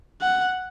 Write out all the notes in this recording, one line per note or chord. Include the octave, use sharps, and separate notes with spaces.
F#5